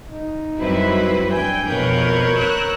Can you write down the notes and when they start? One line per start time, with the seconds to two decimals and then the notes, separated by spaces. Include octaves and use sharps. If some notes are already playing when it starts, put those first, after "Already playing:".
0.10 D#4
0.57 F#2 G3 C4 E4 F#4 B4
1.31 E3 D4 G5 G#5
1.66 F2 B2 A#4 B4 C#5 G6
2.35 A#5 E6 F#6